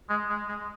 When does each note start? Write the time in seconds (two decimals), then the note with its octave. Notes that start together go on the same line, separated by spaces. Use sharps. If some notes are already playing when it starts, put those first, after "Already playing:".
0.10 G#3
0.29 G#3
0.48 G#3